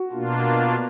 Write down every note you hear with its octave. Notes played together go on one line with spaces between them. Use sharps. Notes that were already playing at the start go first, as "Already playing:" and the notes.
Already playing: F#4
B2 A#3 D4 F4